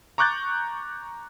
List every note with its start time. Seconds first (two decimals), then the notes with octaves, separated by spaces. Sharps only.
0.18 A#5 C#6 D6 F#6 G6 A6